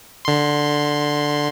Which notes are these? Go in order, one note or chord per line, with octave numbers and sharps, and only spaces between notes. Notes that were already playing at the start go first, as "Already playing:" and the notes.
D3 C6